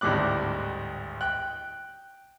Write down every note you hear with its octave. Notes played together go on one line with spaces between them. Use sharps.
G#1 D2 A2 G3 D6 F#6
G5 F#6